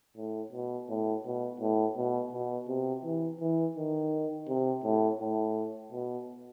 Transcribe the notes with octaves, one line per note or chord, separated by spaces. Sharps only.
A2
B2
A2
B2
A2
B2
B2
C3
E3
E3
D#3
C3
A2
A2
B2